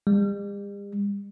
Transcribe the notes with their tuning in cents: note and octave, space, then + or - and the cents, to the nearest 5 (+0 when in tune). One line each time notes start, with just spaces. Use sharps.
G3 +45